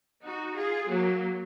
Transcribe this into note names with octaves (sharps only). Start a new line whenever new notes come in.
D#4 F#4
F4 G#4
F#3 A#3